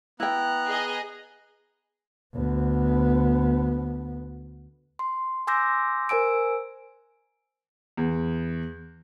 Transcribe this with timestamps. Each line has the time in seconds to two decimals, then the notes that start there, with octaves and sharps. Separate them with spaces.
0.20 B3 E4 G5 A#5 F#6
0.67 G#4 D#5
2.35 D2 B3
4.99 C6
5.47 G#5 C6 D6 E6 G6 A#6
6.09 A#4 C5 G#5 E6 D7
7.97 E2